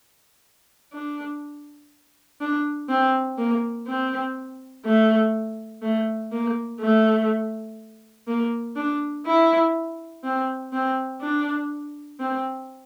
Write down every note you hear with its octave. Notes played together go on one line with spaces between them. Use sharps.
D4
D4
C4
A#3
C4
A3
A3
A#3
A3
A#3
D4
E4
C4
C4
D4
C4